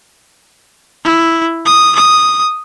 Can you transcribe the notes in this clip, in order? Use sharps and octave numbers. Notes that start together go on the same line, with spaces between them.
E4
D#6
D#6